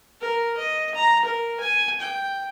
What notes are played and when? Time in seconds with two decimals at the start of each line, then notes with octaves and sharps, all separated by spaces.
0.21 A#4
0.58 D#5
0.95 A#5
1.25 A#4
1.60 G#5
2.01 G5